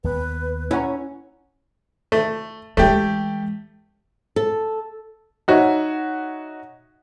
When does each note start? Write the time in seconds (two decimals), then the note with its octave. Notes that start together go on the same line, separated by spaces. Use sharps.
0.04 D#2 B3 B4
0.71 C#4 E4 F#5 A#5
2.12 A3
2.77 E3 G#3 A3 G4
4.36 A4
5.48 D#4 F#4 C#5 E5